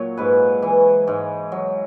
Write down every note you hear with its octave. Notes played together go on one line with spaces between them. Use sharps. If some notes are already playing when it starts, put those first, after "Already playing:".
Already playing: A#2 F#3 C#5
G#2 B4
E3
G#2
F#3